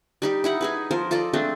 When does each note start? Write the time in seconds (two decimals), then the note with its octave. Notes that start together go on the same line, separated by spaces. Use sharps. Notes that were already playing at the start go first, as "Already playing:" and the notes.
0.22 G3 D#4 G4
0.44 D#4 E4 F#5
0.61 D#4 G#4 B4
0.91 F3 A#4 C5
1.11 F4 A4 D5 D#5
1.33 G#3 A3 C4 D4